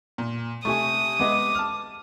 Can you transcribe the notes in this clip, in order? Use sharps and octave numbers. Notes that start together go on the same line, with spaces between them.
A#2
C3 A3 G#5 C#6 D#6
G#3 B3 D#5 D6
A5 F6